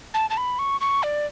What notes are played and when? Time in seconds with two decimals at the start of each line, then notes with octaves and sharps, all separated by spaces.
0.14 A5
0.30 A5
0.37 B5
0.59 C#6
0.81 C#6
1.03 D5